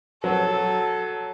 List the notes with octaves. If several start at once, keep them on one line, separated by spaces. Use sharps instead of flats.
F#3 A4